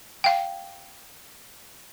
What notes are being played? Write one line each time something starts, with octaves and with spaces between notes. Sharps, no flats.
F5 G5